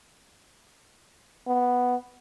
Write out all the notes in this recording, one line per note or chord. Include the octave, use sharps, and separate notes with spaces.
B3